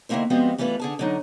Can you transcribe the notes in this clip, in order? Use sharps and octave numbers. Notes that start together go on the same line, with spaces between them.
D3 D#3 F3 A#3 E4 C5
F3 G3 G#3 B3 C4 F#4
E3 G3 A3 F4 B4
D3 G#4 A5
D3 F#3 D#4